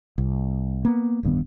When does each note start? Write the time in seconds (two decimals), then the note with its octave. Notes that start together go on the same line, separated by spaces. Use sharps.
0.18 C2
0.85 A#3 B3
1.23 D1 G2 D#3 B3